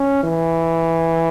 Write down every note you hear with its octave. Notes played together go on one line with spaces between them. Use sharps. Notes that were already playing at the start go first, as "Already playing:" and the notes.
Already playing: C#4
E3